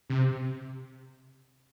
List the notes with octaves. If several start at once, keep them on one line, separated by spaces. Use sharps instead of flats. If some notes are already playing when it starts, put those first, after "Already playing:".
C3